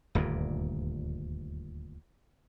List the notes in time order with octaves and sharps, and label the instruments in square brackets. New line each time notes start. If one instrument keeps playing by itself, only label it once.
[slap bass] D#1 D2 G2 A#2